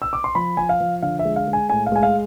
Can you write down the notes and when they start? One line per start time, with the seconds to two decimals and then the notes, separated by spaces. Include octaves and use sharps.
0.02 E6
0.13 D6
0.24 C6
0.35 F3 B5
0.57 F3 G#5
0.69 F5
0.80 F3
1.02 D3 F5
1.19 E5
1.25 G#3
1.36 F5
1.48 G#3
1.53 G#5
1.70 A2 G#5
1.86 F5
1.92 G#3 G#5
2.03 F5